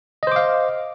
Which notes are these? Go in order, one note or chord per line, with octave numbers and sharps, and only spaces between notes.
C5 D#5 F5 D6